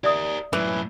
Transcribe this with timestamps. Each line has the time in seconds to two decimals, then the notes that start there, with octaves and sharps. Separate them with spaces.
0.04 G4 A#4 D5 E5 D#6
0.53 F#2 A2 E3